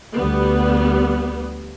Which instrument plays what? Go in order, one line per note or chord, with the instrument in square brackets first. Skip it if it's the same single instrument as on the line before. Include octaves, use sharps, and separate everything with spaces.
[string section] D2 G3 B3